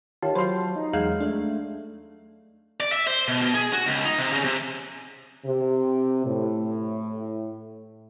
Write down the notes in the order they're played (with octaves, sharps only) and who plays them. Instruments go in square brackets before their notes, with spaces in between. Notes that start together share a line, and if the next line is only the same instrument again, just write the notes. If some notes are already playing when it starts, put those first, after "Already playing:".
[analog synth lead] D#3 [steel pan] F4 [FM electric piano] G4 A5 [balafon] C#5
[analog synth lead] F#3 [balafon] F#4 B5 [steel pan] C5 C6
[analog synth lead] D#4
[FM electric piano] E2 [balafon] F#3 G#3 G#4 [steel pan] F5
[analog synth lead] A3 [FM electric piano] D4
[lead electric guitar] D5
E5
C5
B2
B2
G#4
F#4
C#2
D#4
C3
C#3
C3
[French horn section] C3
A2